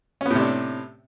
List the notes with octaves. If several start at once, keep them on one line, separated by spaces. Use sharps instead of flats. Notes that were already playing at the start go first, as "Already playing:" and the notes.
A2 C3 B3 C#4 D4